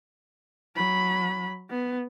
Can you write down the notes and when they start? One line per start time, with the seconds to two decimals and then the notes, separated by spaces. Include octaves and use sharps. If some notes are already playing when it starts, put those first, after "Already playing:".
0.76 F#3 B5
1.70 B3